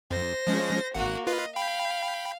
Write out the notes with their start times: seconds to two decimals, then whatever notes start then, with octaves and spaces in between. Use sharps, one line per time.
0.11 F2 C5 A#6
0.47 F3 G#3 C#4
0.94 G#1 A#3 F#4 F#5
1.27 F4 B4 D#5 F5
1.56 F5 G5 B5